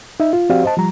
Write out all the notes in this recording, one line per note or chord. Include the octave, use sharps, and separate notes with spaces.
D#4 E5
F4
F3 C4 F#4 G4 D5 F5
C5 D#5 A5
F3 G3 A#5